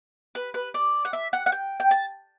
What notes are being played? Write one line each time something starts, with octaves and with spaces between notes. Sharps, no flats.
B4
B4
D5
F#5
E5
F#5
F#5
G5
G5
A5